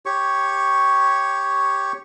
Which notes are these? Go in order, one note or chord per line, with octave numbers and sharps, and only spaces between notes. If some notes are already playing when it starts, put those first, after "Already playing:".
G4 C#5 C#6